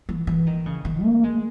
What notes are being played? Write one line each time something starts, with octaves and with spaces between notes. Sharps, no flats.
E3
E3
D#3
C#3
D#3
A#3
G#3